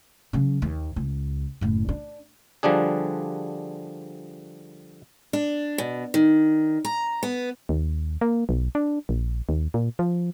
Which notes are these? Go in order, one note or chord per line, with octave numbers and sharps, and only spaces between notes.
C#3 F#3
D#2
C#2
F#1 A2
D4
D3 F3 G3 D4 G#4
D4
B2
D#3
A#5
B3
D#2
A#3
B1
D4
A#1
D#2
A#2
F3